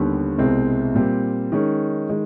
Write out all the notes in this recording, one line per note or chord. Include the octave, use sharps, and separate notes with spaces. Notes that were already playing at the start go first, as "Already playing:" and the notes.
Already playing: D#2 D3 G3 B3
C2 B2 G#3 C4
A#2 G3 C4
D#3 G#3 C#4
D#3 G#3